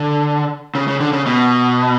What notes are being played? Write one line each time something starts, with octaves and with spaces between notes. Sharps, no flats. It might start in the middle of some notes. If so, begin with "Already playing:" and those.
Already playing: D3
C#3
C#3
D3
C#3
B2